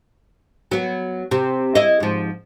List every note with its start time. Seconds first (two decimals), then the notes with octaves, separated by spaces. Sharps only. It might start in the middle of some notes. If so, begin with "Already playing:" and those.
0.71 F#3 B3
1.31 C3
1.75 E4 D#5
2.00 G#2 F3